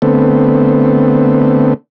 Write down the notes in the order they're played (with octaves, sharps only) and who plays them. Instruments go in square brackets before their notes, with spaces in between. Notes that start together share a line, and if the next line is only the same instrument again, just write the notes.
[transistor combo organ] D3 A3 B3 C4